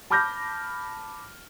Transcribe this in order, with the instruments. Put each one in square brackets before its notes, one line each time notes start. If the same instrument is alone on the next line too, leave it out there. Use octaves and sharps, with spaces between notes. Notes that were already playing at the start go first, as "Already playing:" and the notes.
[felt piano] A5 B5 D6 F6 G6 A#6